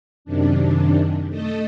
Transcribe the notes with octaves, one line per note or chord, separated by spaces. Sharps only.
F#2 C3 D#3 D4
A3 A4 D#5